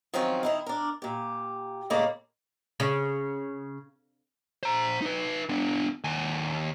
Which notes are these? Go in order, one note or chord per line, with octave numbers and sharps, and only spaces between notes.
D#3 F3 F#3 C4 C#4
D#3 D#4 E4
D4 A#4
A#2 G4
A2 C#3 G#3 A#3 D5
C#3
C5 A#5
D#4 B4
B3 D4
D#2 G#5